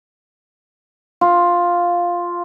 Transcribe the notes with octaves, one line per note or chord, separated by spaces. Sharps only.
F4